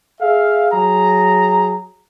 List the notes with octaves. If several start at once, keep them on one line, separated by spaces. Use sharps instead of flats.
G#4 E5 F5
F#3 G#4 A#5